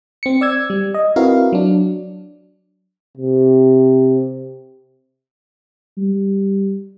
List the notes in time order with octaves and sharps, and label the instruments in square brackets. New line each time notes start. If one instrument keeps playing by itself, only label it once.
[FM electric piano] C4 C#7
D5 E6 G#6
G3
D#5
C4 E4 F#4 A#4 B4 F5
F#3 D4
[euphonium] C3
[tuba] G3